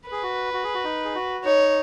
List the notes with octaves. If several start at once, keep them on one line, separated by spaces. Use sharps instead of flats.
G#4 B4
F#4
F#4
G#4
F#4
D#4
G#4
F#4
D#4 C#5